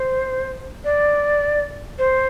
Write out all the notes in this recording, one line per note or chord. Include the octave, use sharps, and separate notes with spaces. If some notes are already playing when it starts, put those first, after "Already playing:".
Already playing: C5
D5
C5